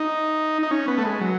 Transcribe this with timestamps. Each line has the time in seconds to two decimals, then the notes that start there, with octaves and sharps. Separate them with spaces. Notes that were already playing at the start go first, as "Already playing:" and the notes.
Already playing: D#4
0.63 D#4
0.71 C#4
0.88 B3
0.98 A3
1.05 G#3
1.21 F#3